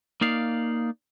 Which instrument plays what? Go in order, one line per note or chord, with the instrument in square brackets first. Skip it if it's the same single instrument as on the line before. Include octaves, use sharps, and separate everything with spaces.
[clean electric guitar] A#3 D#4 D5 F5